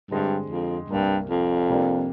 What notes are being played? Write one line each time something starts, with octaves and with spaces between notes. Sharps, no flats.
G2 D3 G#3 C4 G4
F2
C2 G2 C3 G3 A#3
F2
C3 G3 A#3 D4